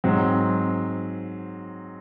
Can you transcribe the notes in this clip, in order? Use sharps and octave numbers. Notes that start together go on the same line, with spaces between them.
G#2 F#3 C4